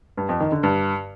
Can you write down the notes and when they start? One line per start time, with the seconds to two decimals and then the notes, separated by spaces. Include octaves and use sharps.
0.17 G2
0.29 F2
0.40 D#3
0.52 D3
0.63 G2